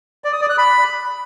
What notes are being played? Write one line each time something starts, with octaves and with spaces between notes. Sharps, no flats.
D5
D#6
D5
F#6
B5